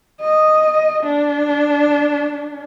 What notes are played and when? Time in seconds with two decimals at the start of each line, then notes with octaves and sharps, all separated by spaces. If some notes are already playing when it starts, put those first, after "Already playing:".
0.20 D#5
1.03 D4